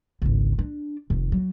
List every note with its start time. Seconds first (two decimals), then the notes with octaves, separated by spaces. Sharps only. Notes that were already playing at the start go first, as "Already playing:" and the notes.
0.22 G#1 C#2
0.59 D4
1.10 F1 D#2
1.32 F#3